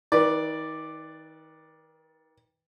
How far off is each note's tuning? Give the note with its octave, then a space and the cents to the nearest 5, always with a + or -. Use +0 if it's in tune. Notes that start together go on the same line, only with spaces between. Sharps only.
D#3 +30 B4 +0 D5 +0